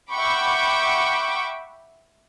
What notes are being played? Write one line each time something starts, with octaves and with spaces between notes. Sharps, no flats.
E5 F#5 G5 B5 C#6 D6